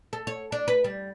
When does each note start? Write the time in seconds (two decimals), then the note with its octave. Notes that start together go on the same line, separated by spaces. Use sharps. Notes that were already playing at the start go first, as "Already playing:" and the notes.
0.13 A4
0.27 C#5
0.52 D4
0.68 B4
0.84 G3